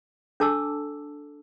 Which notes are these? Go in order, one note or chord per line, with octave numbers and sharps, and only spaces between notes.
D4 A4 A5 D6 E6